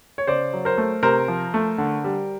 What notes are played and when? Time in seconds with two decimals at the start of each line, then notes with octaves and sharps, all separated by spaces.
0.18 C#5
0.27 C#3 C5 D5
0.53 F#3
0.65 A#4 C5
0.78 A3
1.03 C3 A#4 C5
1.28 F3
1.54 A3
1.78 D3
2.04 G3